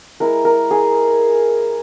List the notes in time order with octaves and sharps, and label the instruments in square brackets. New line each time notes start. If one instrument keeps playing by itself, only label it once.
[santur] G#3 E4 A#4
A#4
G#4